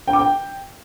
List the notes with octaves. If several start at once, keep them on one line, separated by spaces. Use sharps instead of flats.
G5
D6
G5